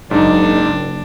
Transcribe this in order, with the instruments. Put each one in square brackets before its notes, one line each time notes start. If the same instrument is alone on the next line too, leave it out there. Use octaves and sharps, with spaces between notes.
[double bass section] F#1 [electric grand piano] G#2 D#4 [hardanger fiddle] D4